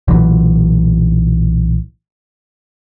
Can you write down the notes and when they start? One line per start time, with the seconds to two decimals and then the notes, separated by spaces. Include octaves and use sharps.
0.08 B1 A#2 E3 F#3